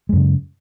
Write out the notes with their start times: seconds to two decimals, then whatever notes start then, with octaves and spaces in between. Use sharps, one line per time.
0.09 G#3
0.13 F#2
0.16 C#3